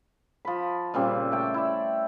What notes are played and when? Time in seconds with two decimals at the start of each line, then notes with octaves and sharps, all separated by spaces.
0.45 F3 B5
0.94 A#2 C#3 G3 C4
1.32 A3 G5 A5
1.54 E4 D5